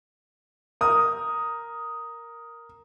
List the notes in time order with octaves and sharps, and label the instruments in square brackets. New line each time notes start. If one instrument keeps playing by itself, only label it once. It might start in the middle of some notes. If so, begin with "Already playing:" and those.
[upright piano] A#4 D#6